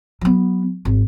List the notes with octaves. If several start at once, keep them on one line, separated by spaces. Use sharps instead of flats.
F#3 B3
G#1